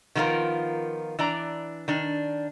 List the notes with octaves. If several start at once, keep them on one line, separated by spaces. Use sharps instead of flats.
D#3 F3 A#3 B3 F4 A#4
E3 D4 D5 A#5
D#3 D4